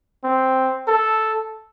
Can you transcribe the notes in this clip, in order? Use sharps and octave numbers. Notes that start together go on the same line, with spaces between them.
C4
A4